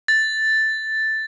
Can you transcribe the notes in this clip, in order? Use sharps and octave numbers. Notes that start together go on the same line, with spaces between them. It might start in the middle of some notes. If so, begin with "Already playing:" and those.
A6